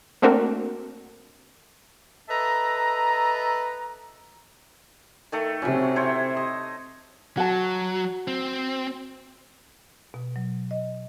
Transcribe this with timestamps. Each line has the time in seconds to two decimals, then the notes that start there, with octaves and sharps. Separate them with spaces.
0.22 A3 A#3 C4 D4 F#4 A#4
2.29 A4 B4 D#5 E5 A5 A#5
5.32 D#3 A3 A4
5.62 C3 F#3 C#4
5.96 E4 C5 C#5
6.37 D#5
7.37 F#3 F#4 A5
8.28 C4
10.14 B2
10.36 F#3
10.71 D#5